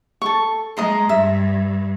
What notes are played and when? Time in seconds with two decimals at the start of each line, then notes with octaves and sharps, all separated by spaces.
0.22 A4 C#6
0.77 G#3 D#5 A#5 C6
1.09 G2 E5